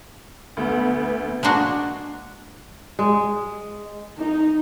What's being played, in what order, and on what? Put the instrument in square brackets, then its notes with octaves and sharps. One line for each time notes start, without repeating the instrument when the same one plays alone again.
[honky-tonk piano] D2 [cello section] B3
[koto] G#3 A#3 D4 F#4
[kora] G#3
[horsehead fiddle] D#4